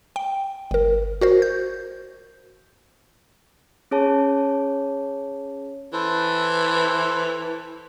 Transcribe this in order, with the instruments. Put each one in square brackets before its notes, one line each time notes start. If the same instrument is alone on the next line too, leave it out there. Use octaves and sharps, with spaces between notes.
[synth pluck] G5
G1 A#4
F#4 A#4 C5
G6
[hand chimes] C#4 G#4 C#5 A5
[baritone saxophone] E3 [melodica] A4 B4 C5